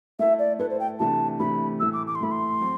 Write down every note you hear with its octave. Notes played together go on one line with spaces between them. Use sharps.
A3 E4 A4 E5
D5
A3 E4 A4 B4
C5
G5
C3 E3 A3 D4 A5
C3 E3 A3 D4 B5
A2 E3 A3 E6
D6
D6
C6
A2 E3 A3 B5
C6
F#3 C4